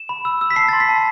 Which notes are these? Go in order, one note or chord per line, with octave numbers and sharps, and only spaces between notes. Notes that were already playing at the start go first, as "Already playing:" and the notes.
Already playing: E7
B5
E6
E6
B6
A5 C7
C6 A6
B6
A5